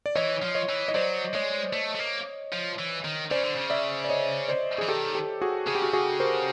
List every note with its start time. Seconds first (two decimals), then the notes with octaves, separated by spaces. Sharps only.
0.06 D5
0.16 E3 C#5 D#5
0.42 F3
0.55 C#5 D#5
0.69 E3
0.88 D#5
0.95 F#3 C5 D5
1.34 G#3 C#5 D#5
1.73 A3
1.95 A3
1.99 A#3
2.53 F3
2.79 E3
3.05 D#3
3.31 C#3 C5 D5
3.44 D3
3.55 C#3
3.70 D5 E5
4.04 D5
4.09 C#5 D#5
4.49 C5 D5
4.78 E3 G#4
4.88 D#3 G4 A4
5.15 G4 A4
5.42 F#4 G#4
5.67 C#3 G#4
5.75 G4
5.82 F#4 G#4
5.93 F#4 G#4
6.20 A#4 C5